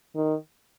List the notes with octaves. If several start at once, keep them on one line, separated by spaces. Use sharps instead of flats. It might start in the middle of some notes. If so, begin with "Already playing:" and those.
D#3